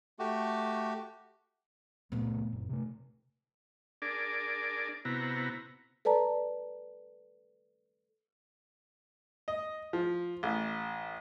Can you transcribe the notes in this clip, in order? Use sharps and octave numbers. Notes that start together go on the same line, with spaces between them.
A3 F#4 G4
C#2 A#2 A3 B3 C4
F#1
C3 A3
D4 G#4 A#4 D5
C3 B3 E4 F#4 A#5
A4 B4 D5 A5 A#5
D#5
F3
A1